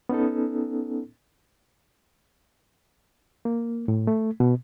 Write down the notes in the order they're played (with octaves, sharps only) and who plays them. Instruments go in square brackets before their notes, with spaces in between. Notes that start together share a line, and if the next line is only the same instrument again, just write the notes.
[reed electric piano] B3 C#4 D#4 A4
A#3
A2
A3
B2